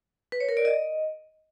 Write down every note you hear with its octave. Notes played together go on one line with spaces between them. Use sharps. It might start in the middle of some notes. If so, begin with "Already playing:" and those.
B4
C#5
A#4
D5
D#5